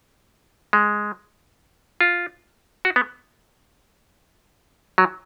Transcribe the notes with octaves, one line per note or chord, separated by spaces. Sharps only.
G#3
F4
F#4
B3
F#3